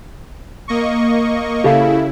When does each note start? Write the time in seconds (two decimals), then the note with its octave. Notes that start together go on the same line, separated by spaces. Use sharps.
0.68 A#3 D#5 C#6
1.64 C#3 E4 G4 A4 F5